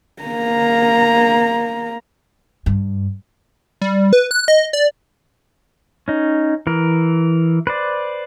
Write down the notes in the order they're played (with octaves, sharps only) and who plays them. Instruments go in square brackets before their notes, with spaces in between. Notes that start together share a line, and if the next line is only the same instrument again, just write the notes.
[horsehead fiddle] A#3 A#5
[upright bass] G2
[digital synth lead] G3
B4
F#6
D#5
D5
[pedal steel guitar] C#4 D#4
E3 A#4
B4 C5 D5